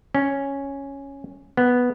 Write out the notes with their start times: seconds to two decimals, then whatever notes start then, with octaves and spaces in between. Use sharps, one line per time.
0.15 C#4
1.57 B3